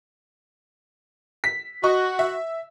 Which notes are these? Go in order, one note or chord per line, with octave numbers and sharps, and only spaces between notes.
B6
F#4 D#5 C#6
E5